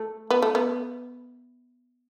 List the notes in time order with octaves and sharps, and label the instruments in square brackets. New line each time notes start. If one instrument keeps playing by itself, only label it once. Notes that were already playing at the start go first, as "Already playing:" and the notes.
Already playing: [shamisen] A3
B3
A3
B3